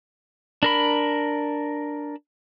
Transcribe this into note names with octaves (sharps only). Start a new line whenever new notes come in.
D4 A#4 B5